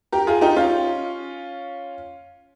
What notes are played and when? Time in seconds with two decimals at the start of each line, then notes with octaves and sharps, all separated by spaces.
0.12 G4 A#4
0.27 F4 G#4
0.41 D#4 G4
0.56 C#4 F4